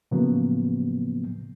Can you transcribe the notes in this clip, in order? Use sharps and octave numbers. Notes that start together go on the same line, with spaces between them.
A2 C#3 F3 F#3 A#3 B3